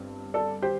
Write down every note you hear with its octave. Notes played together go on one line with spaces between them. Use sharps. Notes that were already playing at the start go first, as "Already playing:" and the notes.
Already playing: G1 G2 C4
A4 D5
G4 C5